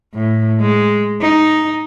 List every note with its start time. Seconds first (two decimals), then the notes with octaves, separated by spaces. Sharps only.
0.14 A2
0.61 G#3
1.21 D#4